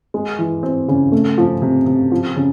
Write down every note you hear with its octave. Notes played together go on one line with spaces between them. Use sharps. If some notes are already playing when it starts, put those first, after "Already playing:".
G#3
E3
C4
C#3
A3
F3
C3
C3
F3
C#3